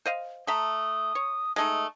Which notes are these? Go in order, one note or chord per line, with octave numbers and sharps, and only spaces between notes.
C5 D#5 F5
A3 E5 A#5 D#6
C#5
G#3 A3 D#4 D#6